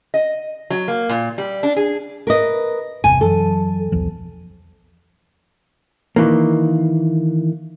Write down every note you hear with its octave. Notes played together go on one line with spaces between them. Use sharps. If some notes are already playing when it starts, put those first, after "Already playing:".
D#5
F#3
A#3
A#2
G3
D4
G#4
A#4 B4 D#5
G1 E2 C3 G#5
F#2 E3 F#3 A4
B1 E2 F3
D#3 E3 A#3